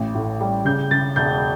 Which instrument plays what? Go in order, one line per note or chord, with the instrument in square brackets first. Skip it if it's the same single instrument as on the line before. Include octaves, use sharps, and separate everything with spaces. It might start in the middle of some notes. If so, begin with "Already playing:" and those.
Already playing: [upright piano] A1
A2
G3
C#3 G6
C#3 A6
E1 G6